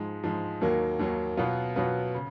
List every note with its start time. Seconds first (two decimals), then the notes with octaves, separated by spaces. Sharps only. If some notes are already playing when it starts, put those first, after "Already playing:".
Already playing: G#2 F3 G#3
0.24 G#2 F3 G#3
0.61 D#2 D#3 F#3 A#3
0.99 D#2 D#3 F#3 A#3
1.37 B2 F#3 B3 F4
1.76 B2 F#3 B3 F4
2.15 C#3